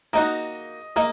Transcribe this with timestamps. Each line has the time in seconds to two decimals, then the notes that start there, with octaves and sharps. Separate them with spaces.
0.13 A#3 D#4 F#4 D#5
0.96 A#3 D#5